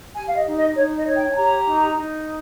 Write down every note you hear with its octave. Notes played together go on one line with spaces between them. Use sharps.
G4 G#5
F5
D#5
D#4
D#5
D#4 C#5
D#5
C#5
G5
G#5
G4 A#5
D#4
D#4